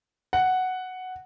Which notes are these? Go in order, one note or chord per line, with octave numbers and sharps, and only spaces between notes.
F#5